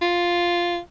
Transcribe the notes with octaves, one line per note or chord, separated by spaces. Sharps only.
F4